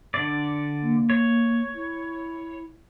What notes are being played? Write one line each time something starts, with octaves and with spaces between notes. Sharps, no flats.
D3 D5
A#3
C#5
E4